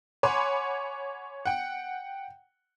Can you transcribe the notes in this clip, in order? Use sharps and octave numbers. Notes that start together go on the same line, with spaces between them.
C#5 F#5 G#5 B5 C6 D6
F#5 G5